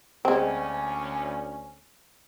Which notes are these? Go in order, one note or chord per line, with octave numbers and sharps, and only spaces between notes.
D2 G#3 C4 C#4